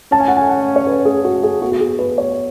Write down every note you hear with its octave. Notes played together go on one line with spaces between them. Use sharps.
C#4 A5
G#5
F#5
G#5
F#5
C#5
B4
G#4
F#4
G#4
B3 F#4
F#4
G#4
B4
C#5